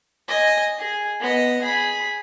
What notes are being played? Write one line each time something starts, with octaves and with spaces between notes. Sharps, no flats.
D#5 G#5
G#4
B3 D#5
G#4 B5